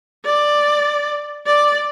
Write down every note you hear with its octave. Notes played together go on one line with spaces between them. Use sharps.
D5
D5